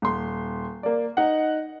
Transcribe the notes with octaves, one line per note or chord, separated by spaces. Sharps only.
D#1 C6
A#3 D5
D#4 F#5